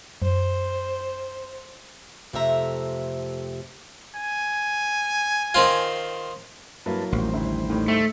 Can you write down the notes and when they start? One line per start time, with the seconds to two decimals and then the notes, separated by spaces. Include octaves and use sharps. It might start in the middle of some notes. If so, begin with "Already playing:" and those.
0.22 F#2 C5
2.33 F2 C3 A3 E5 A#5
4.15 G#5
5.54 D#3 C4 F4
6.86 G2 F#3 A#3 E4 B4 A5
7.12 A1 D#2 G3 C5
7.33 G1 E4
7.70 A2 D#3
7.88 A3